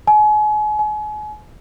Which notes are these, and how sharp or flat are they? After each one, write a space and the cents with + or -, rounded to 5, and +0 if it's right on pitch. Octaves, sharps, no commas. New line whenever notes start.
G#5 +35
G#5 +35